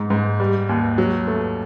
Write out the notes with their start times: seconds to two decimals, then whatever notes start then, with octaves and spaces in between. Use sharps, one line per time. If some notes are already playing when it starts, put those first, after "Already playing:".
Already playing: G#2
0.10 G#2
0.40 G3
0.69 D#2
0.98 F#3
1.27 A3